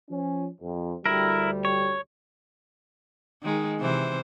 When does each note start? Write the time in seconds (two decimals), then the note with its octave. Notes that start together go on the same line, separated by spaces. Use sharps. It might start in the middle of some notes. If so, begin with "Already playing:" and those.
0.10 F3 C#4
0.61 F2
1.06 D2 G3 E4 A#4
1.65 C#5
3.43 D#3 G#3
3.79 C3 E3 C5